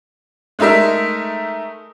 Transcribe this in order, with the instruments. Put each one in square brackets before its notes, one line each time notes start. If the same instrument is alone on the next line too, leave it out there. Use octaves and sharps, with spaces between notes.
[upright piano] G#3 A3 D#4 A#4 E5